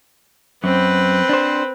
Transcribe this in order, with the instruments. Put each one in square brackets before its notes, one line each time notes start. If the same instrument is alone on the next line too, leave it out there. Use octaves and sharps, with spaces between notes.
[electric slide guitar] F#2 [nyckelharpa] C4 B4
[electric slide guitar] D4 C5